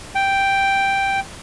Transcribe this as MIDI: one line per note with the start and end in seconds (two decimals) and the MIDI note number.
0.15 1.20 79